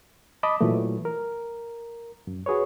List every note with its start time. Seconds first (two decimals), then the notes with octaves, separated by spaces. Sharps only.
0.43 D#5 A5 B5 D6
0.61 A#2 E3 F#3 A3
1.05 A#4
2.27 F#2
2.46 F#4 G#4 B4 C#5